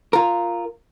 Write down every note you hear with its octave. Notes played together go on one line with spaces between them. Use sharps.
F4 A#4